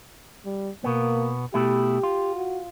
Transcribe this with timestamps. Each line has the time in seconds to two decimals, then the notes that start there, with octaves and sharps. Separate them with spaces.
0.45 G3
0.84 B2 A#3 B3
1.54 B2 A3 E4 G4
2.03 F4
2.35 F#4